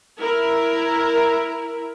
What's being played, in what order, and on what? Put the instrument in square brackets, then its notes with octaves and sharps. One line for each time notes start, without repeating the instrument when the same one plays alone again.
[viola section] E4 A#4